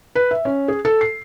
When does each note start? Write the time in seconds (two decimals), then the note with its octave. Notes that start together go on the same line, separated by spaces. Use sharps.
0.15 B4
0.31 E5
0.45 C#4
0.68 G#4
0.85 A4
1.01 C7